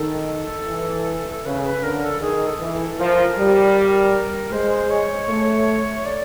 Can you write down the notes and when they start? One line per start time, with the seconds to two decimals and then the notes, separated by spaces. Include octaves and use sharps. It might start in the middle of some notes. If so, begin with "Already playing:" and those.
Already playing: D#3 A4
0.68 E3
1.45 C#3 B4
1.64 B4
1.83 D3 A#4
2.03 A4
2.21 D#3 G#4
2.47 A4
2.60 E3
2.73 A4
2.99 F3 A#4
3.37 G3
4.52 G#3 C5
4.90 C#5
5.29 A3
6.06 D5